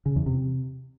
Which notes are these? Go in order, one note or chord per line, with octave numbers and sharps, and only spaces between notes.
C#3
E2
C3